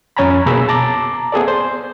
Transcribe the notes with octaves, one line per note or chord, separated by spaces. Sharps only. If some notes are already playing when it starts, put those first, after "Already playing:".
F2 C#4 C#5 G#5 A#5 B5
B2 A#3 G#4 A#5 B5 E6
A5 A#5 D6
B3 G#4 A4 D5
C5